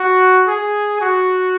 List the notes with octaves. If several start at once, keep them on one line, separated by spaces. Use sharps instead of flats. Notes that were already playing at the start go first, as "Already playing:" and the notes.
Already playing: F#4
G#4
F#4